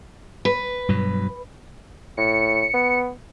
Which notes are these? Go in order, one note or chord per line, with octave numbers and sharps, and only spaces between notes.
B4
G2 B2 F#3
A2 C#7
B3